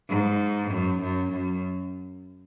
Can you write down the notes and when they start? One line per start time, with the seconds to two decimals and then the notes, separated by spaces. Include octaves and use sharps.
0.09 G#2
0.70 F#2
1.01 F#2
1.32 F#2